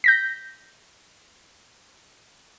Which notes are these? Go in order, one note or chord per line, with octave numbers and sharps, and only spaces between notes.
G6 A#6 B6